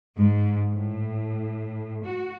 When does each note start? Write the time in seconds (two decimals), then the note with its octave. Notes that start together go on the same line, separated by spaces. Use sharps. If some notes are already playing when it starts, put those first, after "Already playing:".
0.17 G#2
0.74 A2
2.05 F#4